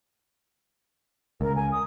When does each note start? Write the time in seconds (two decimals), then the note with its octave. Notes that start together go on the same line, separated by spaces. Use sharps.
1.41 C#2 A#4
1.55 G#5
1.72 D#6